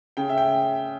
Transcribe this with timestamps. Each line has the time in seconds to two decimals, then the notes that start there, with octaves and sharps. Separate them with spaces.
0.17 C#3 G5
0.29 E5
0.38 G5